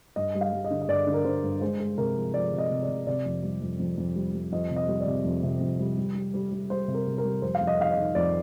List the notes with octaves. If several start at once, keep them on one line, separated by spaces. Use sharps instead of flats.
G2 D#5
G3
F5
G3
D#5
D3
D#5
G2 D5
D3
A#4
D3 C5
G2
G#3 C5
G#3
C3 A#4
F3
F3 D5
C3
D#5
C3
D5
C3
C3 D5
F2
G3
F2
F2
F2
G3
G3
F2 D#5
C3
D#5
G3
D5
C3
F2
C3
F2
G3
G3
G3
G3
G3
G3 C5
C3
A#4
C3
A#4
G3
F2 C5
F5
F2
D#5
D#3 F5
D#5
D#3
F2 D5